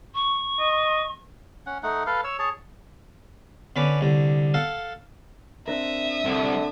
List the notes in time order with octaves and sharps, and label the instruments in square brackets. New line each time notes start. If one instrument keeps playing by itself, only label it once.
[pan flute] C#6
[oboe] D#5
[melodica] C#4 F#5
A3 D#4 F#5
A4 B4 F5
C#5 E6
G#4 C#5 A5
[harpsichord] D3 C#4 B4 D6
C2 D3
A4 F5 F#5
[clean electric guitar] C4 D4 A#4 [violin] E5 D#6
[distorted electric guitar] C2 [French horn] D3